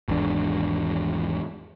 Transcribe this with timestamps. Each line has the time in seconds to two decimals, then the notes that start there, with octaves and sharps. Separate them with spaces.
0.08 G#1 E2 G#2 D4